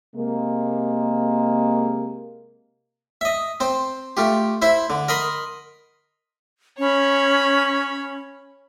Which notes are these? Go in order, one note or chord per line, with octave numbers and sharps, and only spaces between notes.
C3 G#3 A#3
D#5 E5
C4 C5
A3 F4 G4
E4 C5 E5
D3
A#4 D#5 B5 C6
C#4 C#5 B5